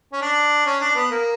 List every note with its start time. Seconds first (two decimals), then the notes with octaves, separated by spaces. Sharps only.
0.13 C#4
0.21 D4
0.66 C#4
0.81 D4
0.96 B3
1.11 A#3